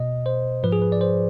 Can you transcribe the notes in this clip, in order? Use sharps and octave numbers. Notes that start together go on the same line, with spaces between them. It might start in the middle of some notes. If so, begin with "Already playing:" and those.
Already playing: B2 D#5
C5
G#2 F3 B4
G#4
B4
D5
C5